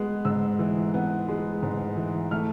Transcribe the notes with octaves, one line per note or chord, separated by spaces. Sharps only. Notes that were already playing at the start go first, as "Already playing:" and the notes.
Already playing: G#3 B3
G#2 E6
E3
B3
G#3
G#2
E3
A3 F6